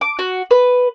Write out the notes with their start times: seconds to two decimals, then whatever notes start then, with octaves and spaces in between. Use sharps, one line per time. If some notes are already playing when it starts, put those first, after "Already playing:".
0.01 D6
0.19 F#4
0.51 B4